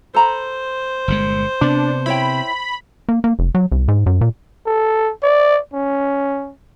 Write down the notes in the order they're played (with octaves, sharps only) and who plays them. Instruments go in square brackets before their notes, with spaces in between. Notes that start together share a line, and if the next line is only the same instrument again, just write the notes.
[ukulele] A4 A#5 B5 [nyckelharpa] C5
[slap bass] G1 A#2 G#3
[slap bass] C3 B3 [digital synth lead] D4
[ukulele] E4 C#5 G5 [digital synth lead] B5
[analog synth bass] A#3
A#3
F1
F#3
C2
G#2
F#2
A#2
[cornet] A4
D5
C#4